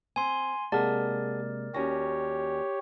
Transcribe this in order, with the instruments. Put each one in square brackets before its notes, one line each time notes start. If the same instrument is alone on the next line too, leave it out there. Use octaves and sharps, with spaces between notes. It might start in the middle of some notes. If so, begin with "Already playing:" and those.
[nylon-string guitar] C4 [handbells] G#5 C6
[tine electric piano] C3 G#3 A#3 [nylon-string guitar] G#4 F#5 A5 [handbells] A#4 D5
[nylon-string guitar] D#2 C#4 F#4 [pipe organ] G4 C#5 [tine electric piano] A#6